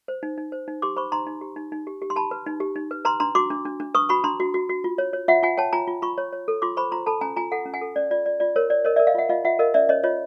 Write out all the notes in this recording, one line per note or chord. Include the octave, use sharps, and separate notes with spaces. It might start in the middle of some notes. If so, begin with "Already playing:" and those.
C5
D#4
D#4
C5
D#4
G4 C6 D6
C5 B5 C#6
D#4 A#5 C6
D#4
G4
D#4
D#4
G4
G4
C6
G4 A5 B5
B4
D#4
G4
D#4
B4
B4 A#5 C6
D4 A#5 C6
F#4 C6 D6
D4
D4
D4
B4 C#6 D#6
F#4 B5 C#6
D4 A#5 C6
F#4
F#4
F#4
F4
C#5
C#5
F4 E5 F#5
F4 F#5 G#5
C#5 G5 A5
F4 G#5 A#5
F4
F4 B5 C#6
C#5
C#5
A4
F4 C6 D6
C5 B5 C#6
F4 A#5 C6
A4 A5 B5
C#4 G#5 A#5
F4 G#5 A#5
A4 F#5 G#5
C#4
F#5 G#5
A4
C#4 D5
F4 D5
F4 D5
F4 D5
A#4 C#5
C#5 D5
A#4 C#5 D#5
D5 E5
A#4
D#5 F5
F4 E5 F#5
F4 D#5 F5
F4 E5 F#5
A#4 D#5 F5
C#4 D5 E5
C#4 C#5 D#5
F4 C#5 D#5